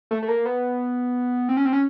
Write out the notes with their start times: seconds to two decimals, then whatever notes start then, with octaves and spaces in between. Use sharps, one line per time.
0.11 A3
0.22 A3
0.28 A#3
0.46 B3
1.49 C4
1.57 C#4
1.65 C4
1.73 C#4